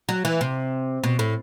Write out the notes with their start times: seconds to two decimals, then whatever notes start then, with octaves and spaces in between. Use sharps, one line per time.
0.09 F#3
0.25 E3
0.41 C3
1.04 B2
1.19 A2